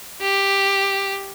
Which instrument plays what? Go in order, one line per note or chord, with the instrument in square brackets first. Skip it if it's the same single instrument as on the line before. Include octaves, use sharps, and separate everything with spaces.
[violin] G4